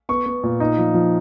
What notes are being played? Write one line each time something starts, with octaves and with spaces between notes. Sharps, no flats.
B3 C#6
B3
A#2
D#4
F3
F3